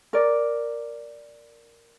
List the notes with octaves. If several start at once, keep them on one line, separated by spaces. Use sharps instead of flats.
A#4 D5